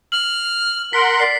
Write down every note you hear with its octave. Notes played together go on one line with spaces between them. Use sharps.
F6 F#7
A#4 F#5 C6 B6
D5 C7